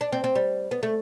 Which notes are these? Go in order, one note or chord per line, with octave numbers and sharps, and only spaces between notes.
D4
C4
C4
G3
B3
A3